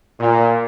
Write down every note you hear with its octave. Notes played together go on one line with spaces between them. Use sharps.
A#2